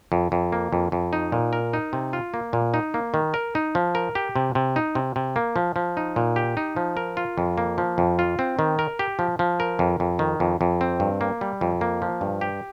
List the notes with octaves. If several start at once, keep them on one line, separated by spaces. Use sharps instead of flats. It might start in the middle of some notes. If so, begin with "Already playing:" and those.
F2
F2
A#3
F2
F2
D#4
A#2
A#4
D#4
C3
F4
A#3
A#2
D#4
A#3
D#3
A#4
D#4
F3
A#4
G4
C3
C3
D#4
C3
C3
A#3
F3
F3
D#4
A#2
G4
D#4
F3
A#4
F4
F2
A#3
F3
F2
F4
C4
D#3
A#4
G4
F3
F3
A#4
F2
F2
D#3
F2
F2
C4
G2
A#3
G3
F2
A#3
F3
G2
G4